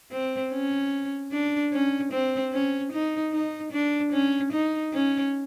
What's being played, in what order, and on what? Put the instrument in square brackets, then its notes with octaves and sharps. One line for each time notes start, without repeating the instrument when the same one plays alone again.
[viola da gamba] C4
C#4
D4
C#4
C4
C#4
D#4
D#4
D4
C#4
D#4
C#4